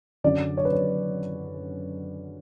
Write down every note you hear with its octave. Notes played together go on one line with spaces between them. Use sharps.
F#2 D3 F#3 C#4 D5
C#5
B4
C#5